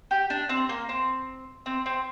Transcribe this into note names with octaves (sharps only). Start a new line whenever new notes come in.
G4
D4
C4
A#3
C4
C4
C4